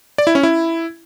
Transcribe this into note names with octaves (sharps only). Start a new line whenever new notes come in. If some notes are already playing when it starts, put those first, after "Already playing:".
D5
E4
C#4
E4